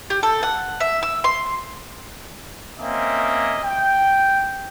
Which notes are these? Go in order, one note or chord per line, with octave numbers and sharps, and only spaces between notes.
G4
A4
F#5
E5
E6
C6
A#3 C4 C#4 D#5 E5
G5